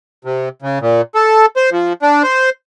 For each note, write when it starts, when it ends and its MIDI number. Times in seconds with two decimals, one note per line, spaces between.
0.25 0.49 48
0.62 0.79 49
0.81 1.01 46
1.15 1.46 69
1.56 1.70 72
1.72 1.93 53
2.02 2.23 62
2.23 2.50 72